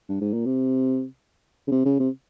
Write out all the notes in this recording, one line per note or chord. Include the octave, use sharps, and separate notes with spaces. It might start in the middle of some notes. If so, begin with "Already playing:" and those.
G2
G#2
A#2
C3
C#3
C3
C#3
C3